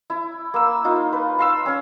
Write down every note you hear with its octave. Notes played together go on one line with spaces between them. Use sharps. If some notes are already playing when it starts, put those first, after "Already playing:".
E4
A#3 E6
D#4 F4
B4
F5 C6 E6
C#4 C#5